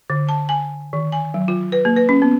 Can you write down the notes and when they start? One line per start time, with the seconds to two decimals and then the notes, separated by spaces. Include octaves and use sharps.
0.10 D3
0.29 A5
0.49 G#5
0.93 D#3
1.12 G#5
1.34 F#3
1.48 F4
1.72 B4
1.85 A#3
1.96 B4
2.09 C#4
2.22 B3